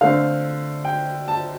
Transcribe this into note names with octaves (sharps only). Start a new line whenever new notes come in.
D3 A3 C4 F5
G5
A5